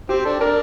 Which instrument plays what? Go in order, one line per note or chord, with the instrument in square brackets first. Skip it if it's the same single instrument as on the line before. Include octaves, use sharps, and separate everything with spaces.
[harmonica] C4 [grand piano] G4
[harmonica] D4 [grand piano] A4
[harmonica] D4 [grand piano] A#4